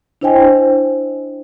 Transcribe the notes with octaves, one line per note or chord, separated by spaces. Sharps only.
D4 E4 C5 D#5 G5 G#5